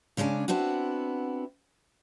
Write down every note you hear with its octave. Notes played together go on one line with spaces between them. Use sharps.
C#3 G#3 C#4 D4 G#5
B3 C4 D4 E4 F#4